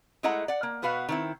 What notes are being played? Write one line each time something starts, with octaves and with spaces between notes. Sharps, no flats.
G#3 A3 E4 D#5 F#5 A#5
D5 F#5
A#3
B2 B3 F#4 B4 F5
D#3 C4 E4